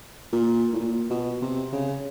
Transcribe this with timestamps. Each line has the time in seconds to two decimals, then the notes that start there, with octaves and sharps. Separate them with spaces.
0.32 A#2
0.73 A2
0.79 A#2
1.10 B2
1.42 C3
1.72 C#3